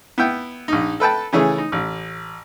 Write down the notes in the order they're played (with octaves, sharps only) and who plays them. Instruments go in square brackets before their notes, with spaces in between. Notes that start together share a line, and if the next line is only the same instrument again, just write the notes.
[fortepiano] B3 E4 G5
A#1 D#4
A4 B4 G5 A5
C#3 E3 A3 G#4 C#5
D#4
A1